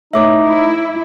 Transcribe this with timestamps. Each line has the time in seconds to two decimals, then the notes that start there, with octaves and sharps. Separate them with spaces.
0.13 A2 B3 D#4 C#5 E5 D6
0.44 E4